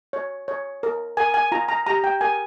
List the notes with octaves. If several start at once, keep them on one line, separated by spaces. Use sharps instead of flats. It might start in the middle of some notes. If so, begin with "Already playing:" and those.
C#5
C#5
A#4
A#4 G#5
G#5
F4 A#5
A#5
G4 A#5
G5
A#4 G#5